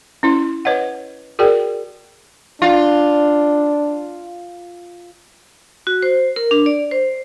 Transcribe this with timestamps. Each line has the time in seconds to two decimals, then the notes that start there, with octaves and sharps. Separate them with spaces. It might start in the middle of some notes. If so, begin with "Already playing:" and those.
0.23 C#4 E4 C6
0.65 B4 C#5 D#5 F#5
1.39 F#4 G#4 A#4 D5 G5
2.62 D4 F4
5.87 F#4
6.03 C5
6.36 A#4
6.51 D4
6.66 D5
6.91 C5